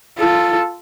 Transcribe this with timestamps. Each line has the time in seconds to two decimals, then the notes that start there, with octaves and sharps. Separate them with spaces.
0.18 F4 A4